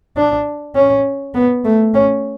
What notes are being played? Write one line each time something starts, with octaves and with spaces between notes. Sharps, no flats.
D4
C#4
B3
A3
C#4